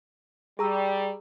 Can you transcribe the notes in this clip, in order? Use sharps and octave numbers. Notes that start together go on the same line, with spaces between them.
G3 G#4 A#5 E6